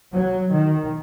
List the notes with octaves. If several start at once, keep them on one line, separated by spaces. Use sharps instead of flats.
F#3
D#3